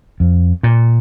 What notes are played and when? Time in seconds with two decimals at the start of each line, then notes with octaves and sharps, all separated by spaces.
0.20 F2
0.63 A#2